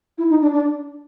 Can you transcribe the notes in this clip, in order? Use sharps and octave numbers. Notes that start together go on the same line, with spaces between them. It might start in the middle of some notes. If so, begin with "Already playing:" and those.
E4
D#4
D4
D4